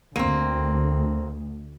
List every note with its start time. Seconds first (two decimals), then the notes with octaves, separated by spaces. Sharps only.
0.16 D2 A#3 C4